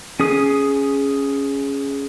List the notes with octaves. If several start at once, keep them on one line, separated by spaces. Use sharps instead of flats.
C#4 G#4 D#6